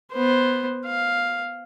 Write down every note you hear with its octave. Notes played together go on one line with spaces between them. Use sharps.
B3 C5
F5